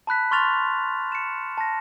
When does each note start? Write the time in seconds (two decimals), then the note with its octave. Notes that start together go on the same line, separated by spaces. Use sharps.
0.07 A5 B5 F#6 B6
0.31 C6 C#6 F6 A6 F7
1.12 C#7 E7
1.58 A5 A#6